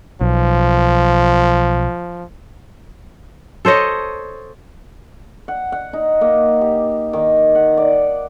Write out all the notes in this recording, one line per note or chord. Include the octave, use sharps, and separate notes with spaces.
B1 F3
A4 C5 C#5 D#5
F#5
F#5
D#4
A#3
G4
D#3
F#5
D5